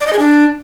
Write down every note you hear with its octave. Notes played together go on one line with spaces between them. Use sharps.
D5
D#5
G#4
D4